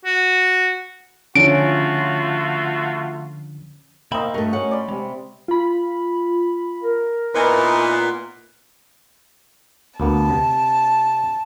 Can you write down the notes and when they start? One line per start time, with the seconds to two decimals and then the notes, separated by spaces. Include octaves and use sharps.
0.05 F#4
1.35 D3 F3 A3 C#4 F4 F#4 D7
4.12 B2 A#3 C4 D#4 E5 B5
4.34 G2 A3 F#4 A#4 C#6
4.53 C#4 F#5
4.71 D5 B5 C6
4.89 C3 G#3
5.48 F4 B5
6.83 A#4
7.34 A#2 B3 D#4 E4 B4 G#5 A#5
10.00 D2 A#3 B3 A5
10.30 C3